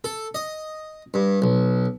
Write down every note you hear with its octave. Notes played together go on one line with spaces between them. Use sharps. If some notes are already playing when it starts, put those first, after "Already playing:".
A4
D#5
G2
B1